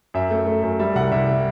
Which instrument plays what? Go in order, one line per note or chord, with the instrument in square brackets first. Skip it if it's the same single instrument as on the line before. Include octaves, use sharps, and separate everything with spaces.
[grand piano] F#2 E5
A3
A3
F#2
G3 E5
C2 F#5
C2 E5